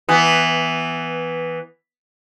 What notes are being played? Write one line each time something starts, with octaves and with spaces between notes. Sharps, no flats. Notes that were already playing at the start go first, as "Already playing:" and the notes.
E3 B3